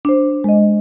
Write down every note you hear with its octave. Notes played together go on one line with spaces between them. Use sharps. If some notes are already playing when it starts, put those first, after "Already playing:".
D4 C5
G#3 D#5